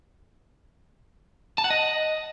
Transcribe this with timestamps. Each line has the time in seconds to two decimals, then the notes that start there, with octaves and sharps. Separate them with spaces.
1.58 A5
1.64 F#5
1.70 D#5